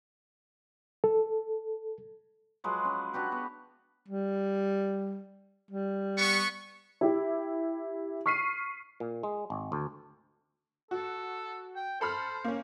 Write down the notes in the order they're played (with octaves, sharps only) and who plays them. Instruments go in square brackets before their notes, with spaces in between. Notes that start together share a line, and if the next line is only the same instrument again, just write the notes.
[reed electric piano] A4
[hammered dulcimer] F3 F#3 G#3 B4
C#4
D4 F#4 G4 B4
B3
[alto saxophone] G3
G3
[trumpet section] B3 C#6
[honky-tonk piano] E4 G4
C#6 F6 B6 C7 D#7
[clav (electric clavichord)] A#2
G#3
G#1
D2
[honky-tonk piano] F#4 [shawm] A4
[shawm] G5
[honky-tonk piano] A4 B5 F6 [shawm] C5
[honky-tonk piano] A#3 C#4